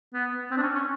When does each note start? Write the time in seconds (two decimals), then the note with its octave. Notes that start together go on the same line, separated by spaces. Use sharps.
0.14 B3
0.51 C4
0.57 D4
0.63 C#4
0.75 C#4